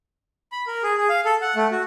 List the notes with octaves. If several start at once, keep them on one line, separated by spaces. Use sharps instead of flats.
B5
A#4
G#4
G#4
F5
A4
F#5
A3
F#4